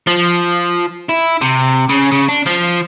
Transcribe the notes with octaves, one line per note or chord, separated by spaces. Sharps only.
F3
E4
C3
C#3
C#3
D4
F3